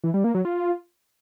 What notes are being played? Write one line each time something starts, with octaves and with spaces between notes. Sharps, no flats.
E3
G3
A#3
F#3
F4